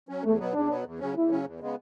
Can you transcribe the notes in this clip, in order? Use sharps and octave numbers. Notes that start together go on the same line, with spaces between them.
F#3 C#4
E2 A3
B2 F#3 B3
E2 D4
B2 F#3 B3
E2
C#3 F#3 C#4
E2 E4
C#3 F#3 C#4
E2
C#3 G#3 B3